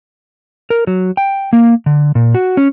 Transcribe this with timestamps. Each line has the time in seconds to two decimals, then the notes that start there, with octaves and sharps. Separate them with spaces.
0.70 A#4
0.87 F#3
1.17 G5
1.53 A#3
1.86 D3
2.15 A#2
2.35 F#4
2.57 C#4